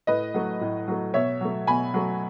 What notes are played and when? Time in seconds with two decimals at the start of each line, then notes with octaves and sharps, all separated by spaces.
0.07 A2 B4 D#5
0.34 F#3 A3
0.61 A2
0.88 F#3 A3
1.14 B2 C#5 E5
1.41 F#3 A3
1.67 B2 G#5 B5
1.94 F#3 A3